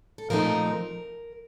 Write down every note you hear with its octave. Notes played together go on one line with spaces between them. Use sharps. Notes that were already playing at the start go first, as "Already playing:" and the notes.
A4
A#2 F3 A3 C4 D#4 A#4